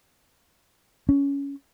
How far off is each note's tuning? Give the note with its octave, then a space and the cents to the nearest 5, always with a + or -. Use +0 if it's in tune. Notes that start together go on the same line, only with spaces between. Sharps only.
C#4 +15